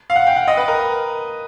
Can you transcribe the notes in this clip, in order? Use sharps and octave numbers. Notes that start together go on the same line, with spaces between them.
F5
F#5
G5
F#5
D#5
B4
A#4